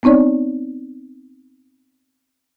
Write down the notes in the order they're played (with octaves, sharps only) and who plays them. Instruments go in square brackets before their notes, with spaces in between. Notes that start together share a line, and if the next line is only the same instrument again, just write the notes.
[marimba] B3 C4 D#4 C#5 D5